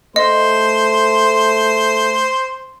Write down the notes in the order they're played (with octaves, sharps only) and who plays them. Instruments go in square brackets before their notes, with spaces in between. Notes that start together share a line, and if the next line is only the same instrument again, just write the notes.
[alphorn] A3 [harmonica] C5 [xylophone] D#5